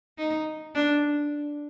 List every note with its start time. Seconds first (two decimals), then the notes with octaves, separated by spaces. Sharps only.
0.18 D#4
0.75 D4